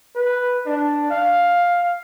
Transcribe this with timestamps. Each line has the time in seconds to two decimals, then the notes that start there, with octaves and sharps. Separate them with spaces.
0.15 B4
0.66 D4
1.10 F5